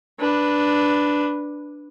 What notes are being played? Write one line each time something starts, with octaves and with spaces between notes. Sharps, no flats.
D4 B4